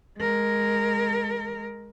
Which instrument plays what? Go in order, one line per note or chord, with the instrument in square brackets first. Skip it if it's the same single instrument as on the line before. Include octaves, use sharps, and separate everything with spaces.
[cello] G#3 A#4